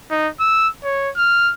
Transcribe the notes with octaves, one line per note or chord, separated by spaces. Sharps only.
D#4
E6
C#5
F6